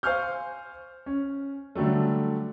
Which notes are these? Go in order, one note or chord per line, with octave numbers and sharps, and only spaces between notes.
C5 F5 G#5 C#6 F6 G6
C#4
D3 F#3 G3 A3